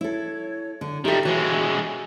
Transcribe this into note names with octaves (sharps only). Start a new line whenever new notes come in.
E4 A4 C#5
D3
D#3 G3 G4 A4 E5 A#5
E3 G#3 F#4 C#5